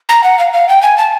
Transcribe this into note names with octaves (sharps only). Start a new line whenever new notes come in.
A#5
F#5
F5
F5
G5
G#5
A5